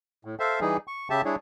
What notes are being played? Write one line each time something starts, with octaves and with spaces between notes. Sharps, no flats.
A2
A4 C5 E5 F5
E3 G3 D#4 G#4
C#6
C#3 G4 E5 A5
G3 D4 E4 G#4 C#5